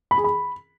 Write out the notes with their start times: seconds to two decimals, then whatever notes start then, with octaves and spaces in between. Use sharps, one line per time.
0.11 B5
0.18 G#4
0.24 B5